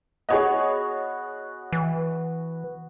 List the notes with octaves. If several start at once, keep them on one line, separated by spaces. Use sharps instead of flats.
B3 F#4 G#4 C#5 D#5
E3